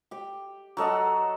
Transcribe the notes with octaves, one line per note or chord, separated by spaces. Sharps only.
G4 G5
F#3 A4 D#5 F#5